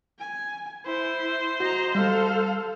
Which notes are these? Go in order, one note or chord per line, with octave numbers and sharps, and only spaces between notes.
G#5
E4 C5
F#4 D#5 A#5
G3 A4 F5